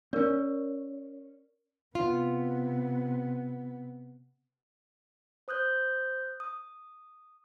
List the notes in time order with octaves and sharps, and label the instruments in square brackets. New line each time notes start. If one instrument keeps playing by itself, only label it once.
[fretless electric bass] C4 C#4 [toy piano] A#4 D5
[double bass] C3 B3 [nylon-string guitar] F4
[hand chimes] C5 D#6 F#6 G6
D#6